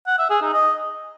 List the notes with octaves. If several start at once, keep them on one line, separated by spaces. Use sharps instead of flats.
F#5
E5
G#4
D#4
D#5